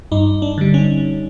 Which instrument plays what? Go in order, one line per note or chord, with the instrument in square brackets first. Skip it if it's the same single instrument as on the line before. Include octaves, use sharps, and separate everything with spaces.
[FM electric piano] G2 D#4
D4
D3 G3
C#4